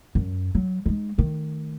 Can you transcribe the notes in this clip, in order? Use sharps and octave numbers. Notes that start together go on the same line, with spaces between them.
F#2
F#3
G#3 D#4
D#3 A3